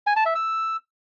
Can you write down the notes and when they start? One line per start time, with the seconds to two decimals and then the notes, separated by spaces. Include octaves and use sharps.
0.07 G#5
0.16 A5
0.26 E5
0.35 E6